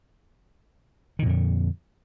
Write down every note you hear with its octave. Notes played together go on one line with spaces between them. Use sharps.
F2 A#2 D3 D#3